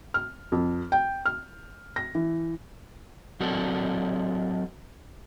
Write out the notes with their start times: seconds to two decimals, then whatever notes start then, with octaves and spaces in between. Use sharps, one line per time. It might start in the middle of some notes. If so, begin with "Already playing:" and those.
0.14 F6
0.52 F2
0.92 G5
1.26 F6
1.96 A#6
2.15 E3
3.40 F#3 C4 F#4 A4 A#4 D5